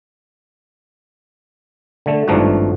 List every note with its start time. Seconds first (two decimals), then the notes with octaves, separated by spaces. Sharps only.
2.06 D3 A3
2.28 G#1 G2 F3 A3 D#4 F#4